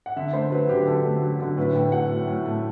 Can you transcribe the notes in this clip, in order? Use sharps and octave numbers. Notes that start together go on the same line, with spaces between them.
F#5
D3 E5
A3 C5
F#3 B4
D3 G4
D3 A4
A3
F#3
D3
A2 B4
A3 G5
F#3 F#5
A2
A2
A3